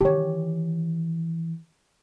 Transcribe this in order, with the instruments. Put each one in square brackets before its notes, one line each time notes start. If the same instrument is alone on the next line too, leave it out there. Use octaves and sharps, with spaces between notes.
[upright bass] D#3 E3 [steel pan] G4 C#5